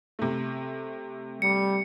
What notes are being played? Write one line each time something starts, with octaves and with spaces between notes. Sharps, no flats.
C3 A3
G3 C#7